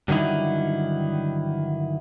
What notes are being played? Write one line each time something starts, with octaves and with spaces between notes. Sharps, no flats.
G2 D3 D#3 F#3 D#4 E4